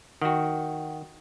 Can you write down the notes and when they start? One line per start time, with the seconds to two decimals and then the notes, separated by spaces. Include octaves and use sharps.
0.22 D#3 F#4 F#5 G5